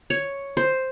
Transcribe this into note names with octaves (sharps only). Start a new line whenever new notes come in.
C#5
C5